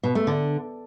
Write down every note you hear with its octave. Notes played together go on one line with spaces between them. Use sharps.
B2
A3
D3